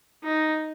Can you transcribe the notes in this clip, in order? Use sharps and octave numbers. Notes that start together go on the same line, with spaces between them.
D#4